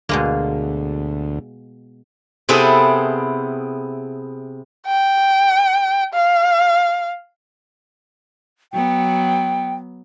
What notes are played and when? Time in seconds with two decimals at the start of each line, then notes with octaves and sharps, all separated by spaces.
0.09 D2 B2 G#3 A#3
2.49 C3 B3 C4 E4 G#4 A4
4.87 G5
6.14 F5
8.73 F#3 B3 G5